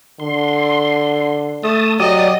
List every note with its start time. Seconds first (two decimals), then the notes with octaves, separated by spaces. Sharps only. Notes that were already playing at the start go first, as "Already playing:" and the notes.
0.20 D3 C6
1.63 A3 A5 D#6
2.00 F#3 G4 D5 D#5 D#6